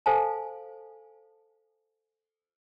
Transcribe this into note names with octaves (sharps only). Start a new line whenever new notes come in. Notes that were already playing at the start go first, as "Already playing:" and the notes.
A4 C5 F5 G#5 A5